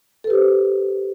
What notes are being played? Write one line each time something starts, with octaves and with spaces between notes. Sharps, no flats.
G4 A4 B4 C5